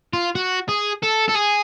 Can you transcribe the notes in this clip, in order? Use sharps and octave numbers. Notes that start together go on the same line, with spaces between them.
F4
F#4
G#4
A4
A4
G#4